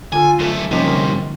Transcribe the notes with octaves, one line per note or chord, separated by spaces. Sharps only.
D3 F4 A4 G#5
F#2 A3
G2 C3 F3 A#3 C#4 D#4
D3 D#3 A#4